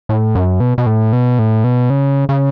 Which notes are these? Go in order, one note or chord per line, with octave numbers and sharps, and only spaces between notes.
A2
F#2
B2
B2
A2
B2
A2
B2
C#3
C#3